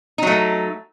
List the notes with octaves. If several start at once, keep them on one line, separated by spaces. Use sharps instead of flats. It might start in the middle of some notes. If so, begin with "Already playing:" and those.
F#3 A3 D#4